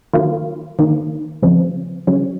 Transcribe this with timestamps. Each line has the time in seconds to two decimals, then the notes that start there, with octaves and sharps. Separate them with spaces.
0.13 D#3 F#3 A#3 F4
0.79 D#3 A#3 D#4
1.42 C#3 F3 C4
2.07 C#3 F#3 C#4